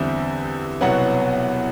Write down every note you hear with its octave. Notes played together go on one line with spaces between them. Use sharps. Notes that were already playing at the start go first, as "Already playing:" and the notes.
Already playing: E2 D3 G3 C4 E5
C2 B2 F#3 B3 F#5